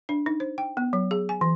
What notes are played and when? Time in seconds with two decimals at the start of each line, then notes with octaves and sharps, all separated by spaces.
0.09 D4
0.26 D#4
0.40 C5
0.58 G5
0.77 B3
0.93 F#3
1.11 G#4
1.29 G#5
1.41 E3